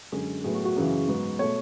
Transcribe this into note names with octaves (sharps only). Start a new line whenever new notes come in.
F#2 D3 G#3 G#4
A2 F#3 B3 G#4
F#4
F#4
F#2 C#3 E3
G#2 F#3 B3
B2 A3 C#5